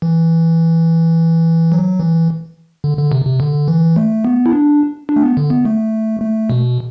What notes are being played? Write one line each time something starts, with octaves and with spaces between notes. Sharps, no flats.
E3
F#3
E3
D3
D3
C3
C3
D3
E3
A3
B3
E4
D4
D4
A3
B3
D3
B3
A3
A3
B2